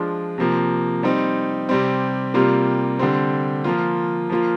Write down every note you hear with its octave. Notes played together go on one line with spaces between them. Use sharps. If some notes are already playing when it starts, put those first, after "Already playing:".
Already playing: F3 G#3 D4 F4
C3 F3 A#3
G3 C4 D#4
C3 G3 C4
C3 G3 A#3 F4
D3 G3 C4
F3 A#3 F4
F3 A#3 F4